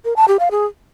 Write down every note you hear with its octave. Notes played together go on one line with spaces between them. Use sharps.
A#4
A5
G4
F5
G#4